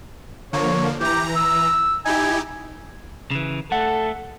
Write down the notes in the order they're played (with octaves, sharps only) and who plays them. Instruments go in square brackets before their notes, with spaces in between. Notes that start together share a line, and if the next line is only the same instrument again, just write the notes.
[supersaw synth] D3 F3 A#3 [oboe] C#5
[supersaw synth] E3 A#5 [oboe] G4
[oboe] E6
[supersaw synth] D#4 E4 G4 [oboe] G#5
[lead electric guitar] C#3 E3
[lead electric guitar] A3 [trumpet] A4 [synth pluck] F#5